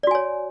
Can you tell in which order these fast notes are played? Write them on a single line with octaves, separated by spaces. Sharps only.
D5 F#4 G#5 C#5